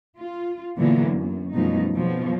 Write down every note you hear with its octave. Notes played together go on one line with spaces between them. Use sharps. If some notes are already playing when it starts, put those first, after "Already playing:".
F4
A#2 D3 E3 F#3 A#3 B3
F#2
F#2 B2 F3 G3 A3 D#4
F2 B2 F3 F#3